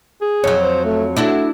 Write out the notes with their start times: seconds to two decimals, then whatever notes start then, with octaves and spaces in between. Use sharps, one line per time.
0.21 G#4
0.44 F2 F#3 C#5
0.60 C5
0.85 A3
1.16 A3 D4 E4 F#4